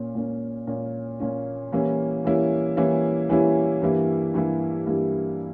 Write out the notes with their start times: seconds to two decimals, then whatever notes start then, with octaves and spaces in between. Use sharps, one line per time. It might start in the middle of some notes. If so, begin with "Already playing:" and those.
Already playing: A#2 A#3 C#4
0.15 A#2 A#3 C#4
0.67 A#2 A#3 C#4
1.20 A#2 A#3 C#4
1.72 E3 G3 A#3 C#4 E4
2.24 E3 G3 A#3 C#4 E4
2.77 E3 G3 A#3 C#4 E4
3.30 E3 G3 A#3 C#4 E4
3.82 G2 E3 G3 A#3 E4
4.34 G2 E3 G3 A#3 E4
4.86 G2 E3 G3 A#3 E4